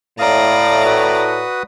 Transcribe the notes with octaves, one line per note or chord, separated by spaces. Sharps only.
A2 D5 F5 A#5 D#6
F#4 B4 D#6